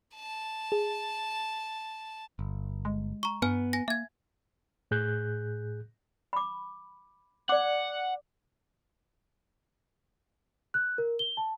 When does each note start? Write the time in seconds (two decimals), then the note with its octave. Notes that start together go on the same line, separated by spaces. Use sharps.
0.15 A5
0.72 G#4
2.39 G1
2.85 G#3
3.23 A#5 C#6
3.42 G2 B3 G#5 F6
3.73 G#5 A#6
3.88 A#3 E5 G#6
4.91 A2 G#4 F#6 G6
6.33 B5 D6
7.49 D5 F#5 D6
10.74 F#6
10.98 A#4
11.19 G7
11.37 A5